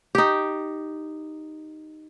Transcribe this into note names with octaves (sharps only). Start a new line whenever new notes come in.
D#4 G4